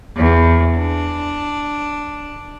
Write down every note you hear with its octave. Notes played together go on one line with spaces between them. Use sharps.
E2
D4